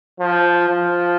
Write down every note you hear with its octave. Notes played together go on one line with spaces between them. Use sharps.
F3
F3